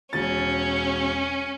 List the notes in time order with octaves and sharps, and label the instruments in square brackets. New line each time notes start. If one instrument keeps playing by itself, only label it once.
[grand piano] E1 A6 [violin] C#4